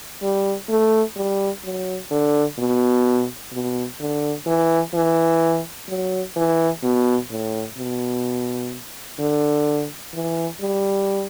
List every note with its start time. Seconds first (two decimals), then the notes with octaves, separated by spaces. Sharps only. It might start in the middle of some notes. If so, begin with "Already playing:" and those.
0.23 G3
0.69 A3
1.17 G3
1.64 F#3
2.11 D3
2.59 B2
3.53 B2
4.00 D3
4.47 E3
4.94 E3
5.89 F#3
6.36 E3
6.84 B2
7.31 A2
7.78 B2
9.19 D3
10.14 E3
10.61 G3